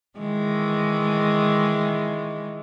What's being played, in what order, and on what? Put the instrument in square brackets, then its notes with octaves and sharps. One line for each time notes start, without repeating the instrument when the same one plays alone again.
[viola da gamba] D#3 E3 G#3